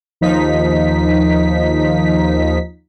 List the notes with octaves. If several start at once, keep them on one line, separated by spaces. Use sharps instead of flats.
D#2 F3 D#4 B6